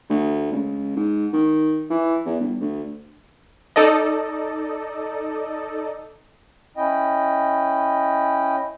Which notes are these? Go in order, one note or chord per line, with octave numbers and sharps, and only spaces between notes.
D2
C#2
G#2
D#3
E3
E2
G1
D2
D#4 A4 D5 D#5
C#4 E4 D#5 G5